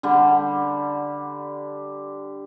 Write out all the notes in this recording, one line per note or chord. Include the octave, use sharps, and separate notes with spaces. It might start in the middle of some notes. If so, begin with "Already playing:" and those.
D3 G3